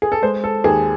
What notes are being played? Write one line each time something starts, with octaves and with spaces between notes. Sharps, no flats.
G#4
A4
G#3 C5
A4
D#2 G#4